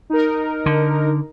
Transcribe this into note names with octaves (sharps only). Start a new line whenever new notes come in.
D#4 A#4
D3